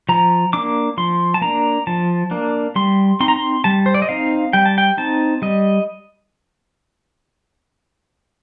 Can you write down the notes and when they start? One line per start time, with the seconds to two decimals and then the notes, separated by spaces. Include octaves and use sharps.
0.09 F3 A#5
0.53 A#3 D4 D6
0.97 F3 C6
1.34 A5
1.42 A#3 D4 A#5
1.87 F3 A5
2.31 A#3 D4
2.76 G3 C6
3.20 C4 D#4 C6
3.28 A#5
3.36 C6
3.64 G3 A5
3.86 C5
3.95 D5
4.02 D#5
4.09 C4 D#4 F5
4.53 G3 G5
4.66 A5
4.78 G5
4.97 C4 D#4 A5
5.42 G3 D#5